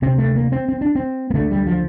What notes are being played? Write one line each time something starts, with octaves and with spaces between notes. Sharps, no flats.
D2 C3 C4
A3
A#3
C4
C4
D4
C4
A#3
D2 D3 A3
G3
F3